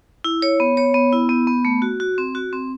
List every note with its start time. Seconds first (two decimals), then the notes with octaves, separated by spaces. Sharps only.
0.24 E4
0.42 C#5
0.60 B3
0.77 C#5
0.94 B3
1.13 E4
1.29 B3
1.47 B3
1.65 A3
1.82 F#4
2.00 F#4
2.18 C4
2.35 F#4
2.53 C4